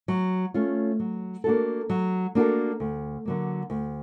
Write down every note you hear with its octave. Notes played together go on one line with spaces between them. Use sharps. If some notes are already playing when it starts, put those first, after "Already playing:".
F#3
A3 C#4 F4
F#3
A#3 D4 F#4 A4
F#3
A#3 D4 F#4 A4
D2
D3 F#3 A#3
D2